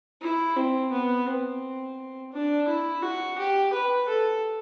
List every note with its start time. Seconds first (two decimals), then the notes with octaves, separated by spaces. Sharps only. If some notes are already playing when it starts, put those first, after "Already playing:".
0.21 E4
0.56 C4
0.92 B3
1.27 C4
2.32 D4
2.68 E4
3.02 F#4
3.38 G4
3.73 B4
4.08 A4